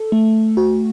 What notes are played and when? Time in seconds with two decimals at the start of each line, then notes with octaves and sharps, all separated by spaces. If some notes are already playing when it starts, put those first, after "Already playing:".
Already playing: A4
0.12 A3
0.57 F#4